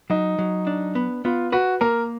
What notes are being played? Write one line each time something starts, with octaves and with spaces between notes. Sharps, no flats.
F#3 D#4
F#3
D4
B3
B3 F4
F#4 B4
A#3 A#4